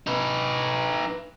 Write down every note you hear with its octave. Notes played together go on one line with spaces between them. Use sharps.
D#4 B4